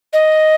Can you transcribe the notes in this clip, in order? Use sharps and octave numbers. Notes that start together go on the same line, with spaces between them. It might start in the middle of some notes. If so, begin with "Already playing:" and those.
D#5